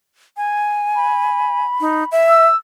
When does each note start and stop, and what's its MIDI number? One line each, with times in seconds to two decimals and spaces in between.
0.37 1.64 80
0.96 2.09 83
1.81 2.04 63
2.12 2.46 76
2.29 2.56 88